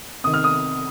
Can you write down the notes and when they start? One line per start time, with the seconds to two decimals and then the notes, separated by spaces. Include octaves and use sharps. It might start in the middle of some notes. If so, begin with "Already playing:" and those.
0.24 C3 D#3 D#6
0.34 F6
0.44 D#6